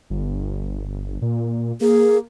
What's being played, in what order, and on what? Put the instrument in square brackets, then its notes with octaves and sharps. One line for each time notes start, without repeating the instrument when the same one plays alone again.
[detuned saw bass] G1
A#2
[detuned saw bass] A#3 [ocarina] G#4